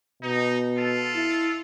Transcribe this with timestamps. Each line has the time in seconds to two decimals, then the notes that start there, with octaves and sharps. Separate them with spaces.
0.23 B2 D#4
0.77 F4 A4
1.15 E4